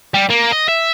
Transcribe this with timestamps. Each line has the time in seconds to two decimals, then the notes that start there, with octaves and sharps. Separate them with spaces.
0.14 G3
0.30 A#3
0.52 D#5
0.68 E5